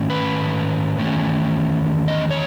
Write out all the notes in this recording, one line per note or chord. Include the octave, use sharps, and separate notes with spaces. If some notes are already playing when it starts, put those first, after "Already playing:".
Already playing: G#2 D#3 A3 C#4
B4
E2 D#3 A3 C#4
D#5
C#5